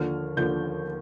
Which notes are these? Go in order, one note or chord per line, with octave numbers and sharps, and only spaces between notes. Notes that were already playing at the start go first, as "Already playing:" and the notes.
Already playing: D#2 D3 F3 F6
D#2 D3 F3 G6